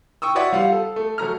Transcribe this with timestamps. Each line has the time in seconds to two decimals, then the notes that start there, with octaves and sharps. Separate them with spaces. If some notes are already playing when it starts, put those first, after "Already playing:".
0.22 G5 C#6 D#6 E6
0.35 F#4 B4 C#5 D5 E5 F#5
0.53 G3 F4 F5 F#5
0.72 A4
0.96 A3
1.18 F#3 A3 A#5 F6